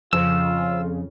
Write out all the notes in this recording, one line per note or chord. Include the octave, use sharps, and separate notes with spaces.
F2 C#3 F3 F4 E6